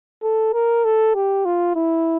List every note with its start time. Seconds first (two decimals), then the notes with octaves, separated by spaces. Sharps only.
0.23 A4
0.53 A#4
0.84 A4
1.15 G4
1.45 F4
1.76 E4